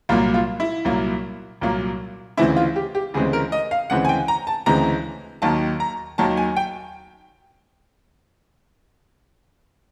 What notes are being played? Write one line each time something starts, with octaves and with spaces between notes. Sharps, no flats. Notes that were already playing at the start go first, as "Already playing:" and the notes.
C2 A#2 F#3 A#3 F4
F4
E4
C2 A#2 F#3 A#3
C2 A#2 F#3 A#3
D2 C#3 E3 G#3 C4 E4
F4
G4
G4
D2 C#3 E3 G#3 C4 G#4
A#4
D#5
F5
D2 C#3 E3 G#3 C4 F#5
G#5
G5
A#5
A5
D2 C#3 E3 G#3 C4 A#5
D#2 D#3 F#3 A#3 A5
A#5
D#2 D#3 F#3 A#3 A5
G#5
G5